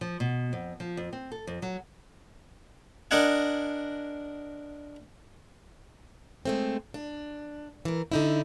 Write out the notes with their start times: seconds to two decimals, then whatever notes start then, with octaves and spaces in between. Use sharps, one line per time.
0.01 F3
0.20 B2
0.53 F2
0.80 F3
0.97 F2
1.13 C4
1.32 A4
1.47 F2
1.62 F#3
3.11 D4 A#4 D#5 F#5 G#5
6.45 G#3 A3 C4
6.94 D4
7.85 E3 A#4
8.12 D3 D#4 E4